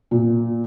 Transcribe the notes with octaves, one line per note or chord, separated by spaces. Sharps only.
A#2